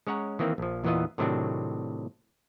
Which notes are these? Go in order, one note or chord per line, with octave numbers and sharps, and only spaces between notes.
G#3 C#4 C#5 F#5 A#5
D#3 E3 A#3 C4
A#1 F3
E2 A#2 E3 B3 F4 D#5
A2 C3 D#3 F#3 C4 D4